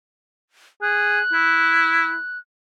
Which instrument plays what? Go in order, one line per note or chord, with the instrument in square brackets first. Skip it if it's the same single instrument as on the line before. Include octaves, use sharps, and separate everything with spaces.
[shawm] G#4 [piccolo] F#6
[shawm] E4